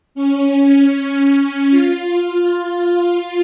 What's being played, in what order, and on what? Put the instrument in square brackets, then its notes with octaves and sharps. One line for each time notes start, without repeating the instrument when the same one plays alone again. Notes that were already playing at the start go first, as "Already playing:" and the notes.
[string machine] C#4
C#4
F4